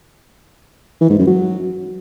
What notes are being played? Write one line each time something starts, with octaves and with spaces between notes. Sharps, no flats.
E3
G#2
F#2
F#3